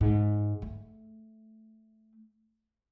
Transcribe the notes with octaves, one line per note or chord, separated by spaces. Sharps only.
G#2
A3